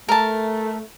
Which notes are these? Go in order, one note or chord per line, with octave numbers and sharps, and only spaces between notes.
A3 A#4 A5